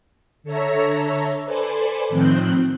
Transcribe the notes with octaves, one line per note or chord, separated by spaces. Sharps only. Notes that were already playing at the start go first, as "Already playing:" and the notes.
D3 A4 C#5 E5 A#5
A4 B4 C5 D5 G#5
A2 D#3 F3 C4 F#6 G6